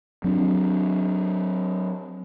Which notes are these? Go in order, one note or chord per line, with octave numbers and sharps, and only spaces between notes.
F#3 C4 D4